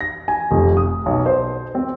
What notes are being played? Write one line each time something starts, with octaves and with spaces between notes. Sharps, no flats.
A#6
G#5
F1
D#6
B1
C5
C4